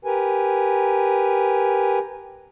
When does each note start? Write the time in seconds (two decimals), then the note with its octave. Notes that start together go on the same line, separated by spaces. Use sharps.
0.05 G4 A#4 B4 G#5